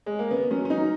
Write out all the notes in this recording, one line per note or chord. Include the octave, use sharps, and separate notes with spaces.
G#3
A#3
C#3 B3
F#3 C#4
C#4
F#3 D#4